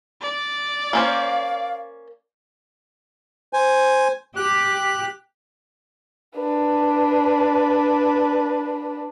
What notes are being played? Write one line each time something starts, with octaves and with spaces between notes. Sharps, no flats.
D5
A#3 C#4 C5 F5
C5 G#5
G4 F#6
D4 B4